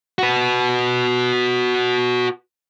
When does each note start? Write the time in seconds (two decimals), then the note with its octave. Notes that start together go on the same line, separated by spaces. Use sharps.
0.18 F#4 B4